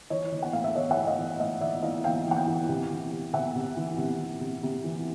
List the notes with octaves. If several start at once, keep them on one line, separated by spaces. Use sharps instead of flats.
E3 C#5 D#5
E3
F#5
A2 F5
E5
E3 C#5 D#5
E5 F#5
A2
D#5 F5
E3
A2 D#5 F5
E3 D5 E5
E3 D#5 F5
E3 F5 G5
E3
F#5
F5 G5
E3
C3
E3
C3
C3 E5 F#5
C3
E3
C3
E3
C3
C3
E3